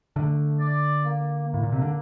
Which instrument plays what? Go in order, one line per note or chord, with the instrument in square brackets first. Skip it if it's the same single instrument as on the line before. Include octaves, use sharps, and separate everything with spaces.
[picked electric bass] D3 [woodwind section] A3
[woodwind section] D5
A#3
A#3
[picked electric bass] A2
A#2
C3
D3